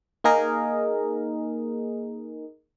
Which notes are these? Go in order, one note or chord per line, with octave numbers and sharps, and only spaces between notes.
A#3 D#4 G#4 A#4 D#5